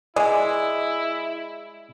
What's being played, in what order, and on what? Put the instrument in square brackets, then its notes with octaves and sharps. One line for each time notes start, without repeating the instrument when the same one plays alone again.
[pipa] G#3 [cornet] E4 [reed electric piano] D5 G#5